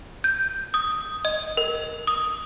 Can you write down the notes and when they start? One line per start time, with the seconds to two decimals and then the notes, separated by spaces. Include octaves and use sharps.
0.24 G6
0.74 D#6
1.25 D#5
1.57 A#4
2.07 D#6